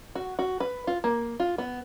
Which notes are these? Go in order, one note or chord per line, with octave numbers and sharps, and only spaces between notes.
F#4
F#4
B4
F4
A#3
F4
B3